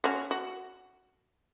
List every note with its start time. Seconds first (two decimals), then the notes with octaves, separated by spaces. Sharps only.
0.04 C#4 F#4
0.31 F#4